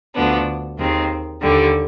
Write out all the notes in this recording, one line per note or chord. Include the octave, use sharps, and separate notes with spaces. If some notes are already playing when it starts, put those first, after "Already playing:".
D2 D3 F3 B3 D4
D#2 D#3 G#3 C4
D#2 D3 G3